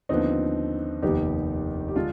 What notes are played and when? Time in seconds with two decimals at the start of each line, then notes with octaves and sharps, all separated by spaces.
0.09 D#2 D3 F3 B3 C4 D#4
1.02 F1 D#2 D#3 B3 D#4 G4
1.88 G4
1.95 D3 G#3 D4 F4